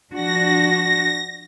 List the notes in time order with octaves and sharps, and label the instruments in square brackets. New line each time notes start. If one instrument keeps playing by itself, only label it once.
[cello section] F3 D4 F#4 [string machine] A#6